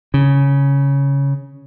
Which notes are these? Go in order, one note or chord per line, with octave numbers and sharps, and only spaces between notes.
C#3